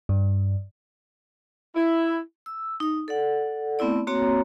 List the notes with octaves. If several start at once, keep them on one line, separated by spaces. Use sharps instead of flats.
G2
E4
E6
D#4 D#6
A4 D5 F#5
A3 B3 C4 E4 D5
A#3 C4 F#4 C#5 A#5